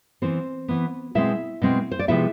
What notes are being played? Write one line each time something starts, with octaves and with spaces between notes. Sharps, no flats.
E3 B3 C4 C5
E3 B3
B2 G#3 C4 E4 E5
B2 G#3 C4
C5
D5
C3 F3 G#3 B3 E4 E5